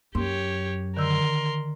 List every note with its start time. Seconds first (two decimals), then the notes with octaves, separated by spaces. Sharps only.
0.15 F#2 G4 C#5 C6
0.97 D3 D#3 A#4 C6 E6